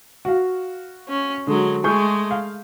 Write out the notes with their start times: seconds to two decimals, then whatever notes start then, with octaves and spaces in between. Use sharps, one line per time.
0.25 F#4 F5
1.09 C#4
1.47 D3 F#3 G#3
1.84 G#3 A3 G#4 C#6 G6
2.31 F5